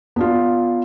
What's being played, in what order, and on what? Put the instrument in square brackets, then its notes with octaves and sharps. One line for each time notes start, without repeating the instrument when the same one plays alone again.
[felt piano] B3 D4 F4